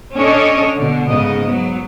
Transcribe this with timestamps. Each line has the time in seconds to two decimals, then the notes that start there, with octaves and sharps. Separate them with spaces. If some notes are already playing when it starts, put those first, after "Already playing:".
0.16 C#4 D4 A4 C#5 D#5
0.76 B2 D3
1.06 G#2 C#3 B3 D#5
1.45 F#3 B3